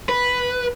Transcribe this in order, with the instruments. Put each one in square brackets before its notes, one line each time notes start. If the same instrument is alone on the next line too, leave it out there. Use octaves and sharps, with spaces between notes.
[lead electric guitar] B4